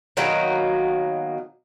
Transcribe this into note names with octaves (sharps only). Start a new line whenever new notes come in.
B2 D#3 F#3 A#3